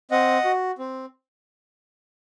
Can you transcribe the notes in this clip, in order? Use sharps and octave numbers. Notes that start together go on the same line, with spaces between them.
C4 D#5 F#5
F#4
C4